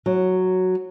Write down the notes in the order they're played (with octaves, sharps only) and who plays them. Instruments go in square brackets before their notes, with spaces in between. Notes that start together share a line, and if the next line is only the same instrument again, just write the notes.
[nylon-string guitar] F#3